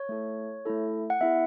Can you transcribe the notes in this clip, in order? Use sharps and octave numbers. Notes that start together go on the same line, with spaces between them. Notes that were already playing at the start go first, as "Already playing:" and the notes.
Already playing: C#5
A3 E4 A4
A3 E4 A4
F#5
B3 E4 G#4 E5